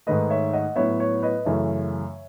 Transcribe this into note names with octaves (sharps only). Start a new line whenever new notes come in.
G#2 D#3 A3 B4 D#5
C#5 E5
D#5 F#5
A2 F#3 B3 C#5 E5
C#5
B4 D#5
F#2 C#3 E3 A3 C#5 E5